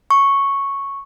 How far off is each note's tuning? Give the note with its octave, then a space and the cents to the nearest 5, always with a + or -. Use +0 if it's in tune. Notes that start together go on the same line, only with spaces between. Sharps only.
C#6 -5